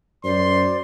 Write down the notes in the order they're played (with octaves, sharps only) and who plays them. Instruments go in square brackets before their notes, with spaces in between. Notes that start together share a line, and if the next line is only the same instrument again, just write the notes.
[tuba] F#2 [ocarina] C5 [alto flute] D5 [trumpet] C6